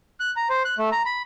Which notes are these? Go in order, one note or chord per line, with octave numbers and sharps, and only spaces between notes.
F#6
A#5
C5
F#6
A3
A#5
B5